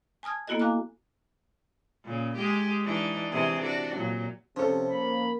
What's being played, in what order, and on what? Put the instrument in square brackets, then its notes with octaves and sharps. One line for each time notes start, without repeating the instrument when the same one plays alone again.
[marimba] G#5 A5 D#6 F6 G#6
A#3 B3 E4 F#4 A4 D#5
F5 G#5 A#5 D6 F6 F#6
[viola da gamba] A#2 C#3
G#3 G4 G#4
E3 D4 D#4
C3 E3 G#4
D4 F#4
A#2 F#3
[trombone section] C3 [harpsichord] F3 [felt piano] C#4 A4
[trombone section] A#3 [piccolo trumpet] B5